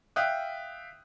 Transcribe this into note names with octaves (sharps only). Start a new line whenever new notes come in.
E5 F5 G5 D#6 F#6